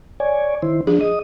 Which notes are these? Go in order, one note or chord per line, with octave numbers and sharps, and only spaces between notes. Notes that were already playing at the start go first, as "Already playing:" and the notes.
C#5 D5 G#5
D#3 E4 C5
F3 D4 G#4
D#5 D#6